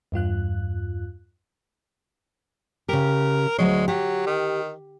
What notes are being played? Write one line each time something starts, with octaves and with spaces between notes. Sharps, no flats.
E2 G2 F4 F#6
C#3 G4 A#4
D2 F#3 G#3 C#5
F#3 G4
D#3